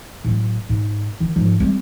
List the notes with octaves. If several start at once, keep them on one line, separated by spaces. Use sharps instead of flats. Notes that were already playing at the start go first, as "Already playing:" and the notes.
A2 F#3
G#2
D#3 E3
G#2 F3
G3 C4